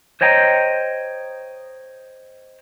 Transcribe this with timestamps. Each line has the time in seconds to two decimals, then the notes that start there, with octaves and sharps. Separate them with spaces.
0.21 C5 C#5 D#5 G5 A#5